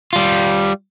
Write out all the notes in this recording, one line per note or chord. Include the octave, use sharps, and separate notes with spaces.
G3 F4